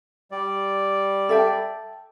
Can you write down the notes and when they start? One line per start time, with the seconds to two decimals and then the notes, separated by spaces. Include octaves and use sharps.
0.31 G3 D5
1.29 A4 E5 G5